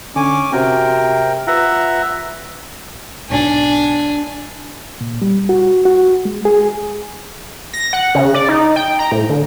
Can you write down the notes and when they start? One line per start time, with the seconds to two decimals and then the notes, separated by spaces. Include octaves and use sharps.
0.16 D3 C#4 G#5 D6
0.52 C3 C4 F#4 A#4 C5 G5
1.47 F4 B4 E5 F#5 A#5
3.30 B1 G#2 B2 D4 G#5
5.01 A#2
5.22 G3
5.49 F#4
5.85 F#4
6.25 G#3
6.45 G#4
7.73 A#6
7.93 F#5
8.15 C#3
8.34 D5
8.49 D#4
8.76 G5
8.99 A#5
9.12 A2
9.29 D3